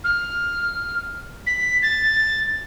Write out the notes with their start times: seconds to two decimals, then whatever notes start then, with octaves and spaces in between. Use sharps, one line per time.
0.04 F6
1.46 B6
1.82 A6